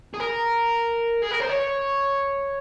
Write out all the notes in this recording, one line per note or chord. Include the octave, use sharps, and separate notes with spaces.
G#4
A#4
G#4
A#4
C5
C#5